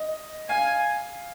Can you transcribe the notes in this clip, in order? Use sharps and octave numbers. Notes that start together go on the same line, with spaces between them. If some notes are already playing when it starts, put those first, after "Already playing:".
Already playing: D#5
F5 G#5